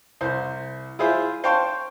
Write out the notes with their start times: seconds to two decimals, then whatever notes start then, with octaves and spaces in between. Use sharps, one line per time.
0.21 C2 C5
0.99 E4 F4 G#4 C5 E5
1.44 C5 F5 G5 A5 C6 C#6